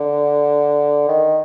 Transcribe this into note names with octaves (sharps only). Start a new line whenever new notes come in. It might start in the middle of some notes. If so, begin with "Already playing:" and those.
Already playing: D3
D#3